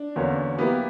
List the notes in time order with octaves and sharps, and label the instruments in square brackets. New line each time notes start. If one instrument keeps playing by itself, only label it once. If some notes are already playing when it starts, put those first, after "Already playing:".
Already playing: [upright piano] D4
[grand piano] E2 D3 A#3 C#4 F#4
[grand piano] F#3 A#3 E4 G4 B4 [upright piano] B3